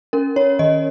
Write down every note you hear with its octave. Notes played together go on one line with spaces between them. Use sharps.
C#4 A#4
C#4 C#5
D#3 D#5